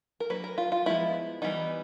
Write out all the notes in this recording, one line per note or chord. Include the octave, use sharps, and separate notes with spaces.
A#4
F#3 A#3 D4 B4
A#4
F4
F4
F3 G#3 B3 E4
E3 G3 B3 D#4